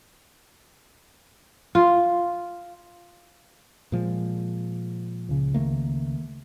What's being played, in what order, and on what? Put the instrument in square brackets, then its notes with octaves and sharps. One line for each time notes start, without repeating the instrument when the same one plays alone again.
[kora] F4
[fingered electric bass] A#2 F3 G#3
[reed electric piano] C#2 C#3
[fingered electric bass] D#3 A3 A#3